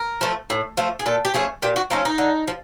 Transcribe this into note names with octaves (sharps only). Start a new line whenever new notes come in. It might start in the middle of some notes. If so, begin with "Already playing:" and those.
Already playing: A#4
F3 A3
A2
F3 A3
G#4
A#2 A4
G4
F3 A3 C#4 G#4
A#2 G4
F#4
F3 A3 C#4 D#4
D#4
D3
F3